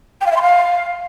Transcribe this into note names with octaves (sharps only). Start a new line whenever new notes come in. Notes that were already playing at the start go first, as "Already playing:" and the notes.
G5
F5
E5
C6
F5